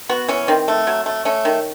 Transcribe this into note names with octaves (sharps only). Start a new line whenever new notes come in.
B3 F#4
E3 C#4
D#3 C4
A3
F#3
A3
A3 C#4
D#3